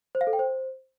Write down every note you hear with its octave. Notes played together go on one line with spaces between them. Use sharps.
C5
F5
A4
G5
C5